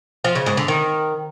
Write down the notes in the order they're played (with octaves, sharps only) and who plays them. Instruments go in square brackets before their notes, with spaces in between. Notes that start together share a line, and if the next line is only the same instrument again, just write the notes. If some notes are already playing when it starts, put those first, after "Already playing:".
[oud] F3
C#3
G#2
D3
D#3